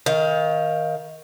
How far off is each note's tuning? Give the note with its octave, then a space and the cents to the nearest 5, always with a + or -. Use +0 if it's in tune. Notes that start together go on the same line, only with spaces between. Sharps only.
D#3 +20 F5 +0